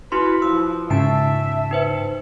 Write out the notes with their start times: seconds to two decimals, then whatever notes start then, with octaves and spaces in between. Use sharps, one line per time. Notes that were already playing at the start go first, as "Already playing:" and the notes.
0.12 E4 F#4 B4 C6
0.42 F3 E6
0.90 G#2 C#3 D#4 E5 A5
1.71 D#4 B4 C5